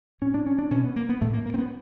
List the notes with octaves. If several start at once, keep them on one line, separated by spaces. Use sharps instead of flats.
A2 C#4
D4
C#4
D4
B2 C#4
B3
A#3
B3
A2 A3
A#3
A#3
C4
B3